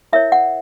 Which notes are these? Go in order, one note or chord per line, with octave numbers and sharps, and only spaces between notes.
E4 A#4 C#5 E5
F#5